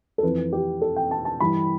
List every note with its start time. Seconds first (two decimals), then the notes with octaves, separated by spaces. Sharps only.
0.18 A4
0.23 F2 E3 B4
0.53 G4
0.81 A4
0.96 G5
1.11 A5
1.25 A5
1.40 G2 E3 B5